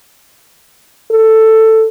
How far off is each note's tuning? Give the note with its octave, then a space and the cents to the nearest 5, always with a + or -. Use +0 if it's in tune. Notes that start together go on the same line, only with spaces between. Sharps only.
A4 +10